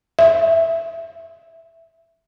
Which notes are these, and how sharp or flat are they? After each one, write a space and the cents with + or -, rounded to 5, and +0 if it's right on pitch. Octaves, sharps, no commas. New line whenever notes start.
E5 +0